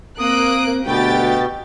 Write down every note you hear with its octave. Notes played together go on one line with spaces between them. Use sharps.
A#3 C4 D#6 F#6 D7
D2 B2 G4 G5 A6